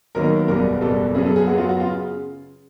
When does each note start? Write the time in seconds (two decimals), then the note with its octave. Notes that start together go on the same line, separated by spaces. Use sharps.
0.15 D#2 D#3 F#3 B3 A#4
0.48 F#1 E2 B2 G3 B3 A#4
0.81 F#1 E2 B2 G3 B3 A4
1.14 F#2 C#3 F#3 B3 G#4
1.26 A4
1.36 G#4
1.47 F#2 C#3 F#3 B3 F#4
1.58 F4
1.69 F#4
1.80 C#3 F4